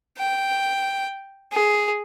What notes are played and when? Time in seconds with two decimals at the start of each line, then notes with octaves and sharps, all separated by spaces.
0.17 G5
1.52 G#4